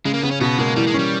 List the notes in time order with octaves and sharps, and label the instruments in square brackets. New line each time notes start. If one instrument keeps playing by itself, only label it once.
[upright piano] C#3 [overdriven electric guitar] G#3
[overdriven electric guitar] A#3
[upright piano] C#3 [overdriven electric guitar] B3
[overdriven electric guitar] C#4
[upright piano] B2 [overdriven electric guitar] B3
[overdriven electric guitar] G#3 [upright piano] A#3
[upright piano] E3 [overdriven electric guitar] G3
[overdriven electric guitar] G#3
[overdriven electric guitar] G3 [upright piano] C#4